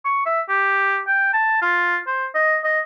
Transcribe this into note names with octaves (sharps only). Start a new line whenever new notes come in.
C#6
E5
G4
G5
A5
F4
C5
D#5
D#5